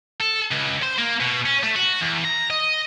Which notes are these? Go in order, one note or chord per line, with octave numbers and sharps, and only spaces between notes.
A4
C#2
C5
A#3
B2
C#4
A3
F#4
E2
A#5
D#5